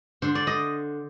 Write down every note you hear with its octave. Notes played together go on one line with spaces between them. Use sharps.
D3 C5
D5
D#5